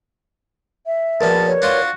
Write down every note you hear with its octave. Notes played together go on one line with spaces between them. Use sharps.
E5
A#1 B2 C#4 A#4 B4 D5 A5
C#5
D4 F4 F#4 C5